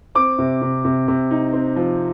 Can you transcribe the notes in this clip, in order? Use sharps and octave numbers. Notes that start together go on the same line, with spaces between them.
C4 D6
C3
C3
C3
C3
D#4
C4
F3